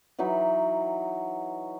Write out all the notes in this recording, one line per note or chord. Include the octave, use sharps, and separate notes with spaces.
E3 F#3 D#4 B5